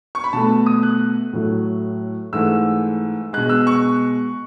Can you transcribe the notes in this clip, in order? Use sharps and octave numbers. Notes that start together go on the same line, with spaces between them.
C#6
B5
B2 A3 A5
D#6
F#6
A2 F#3 A3
G#2 E3 A3 E6
B2 G#3 F#6
E6
C#6